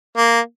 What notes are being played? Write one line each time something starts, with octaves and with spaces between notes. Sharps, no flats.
A#3